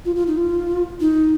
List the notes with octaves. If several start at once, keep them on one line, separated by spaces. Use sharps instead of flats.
F4
F4
D#4
F4
D#4